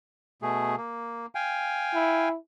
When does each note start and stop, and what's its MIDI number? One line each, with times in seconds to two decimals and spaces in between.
0.42 0.75 47
0.42 0.75 57
0.42 0.75 68
0.77 1.26 58
1.35 2.29 77
1.35 2.29 79
1.35 2.29 80
1.94 2.36 64